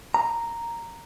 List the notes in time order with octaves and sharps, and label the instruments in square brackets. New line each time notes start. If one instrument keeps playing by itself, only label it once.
[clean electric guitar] A#5